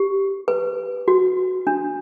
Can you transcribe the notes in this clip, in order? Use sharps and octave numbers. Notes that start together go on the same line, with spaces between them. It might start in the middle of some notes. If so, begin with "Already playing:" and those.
Already playing: G4
B4
F#4
D4